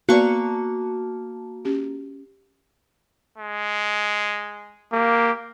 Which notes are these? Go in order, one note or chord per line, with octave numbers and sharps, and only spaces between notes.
A#3 B3 F#4 B4 D5 A5 C#6
C#4 G4
G#3
A#3 G4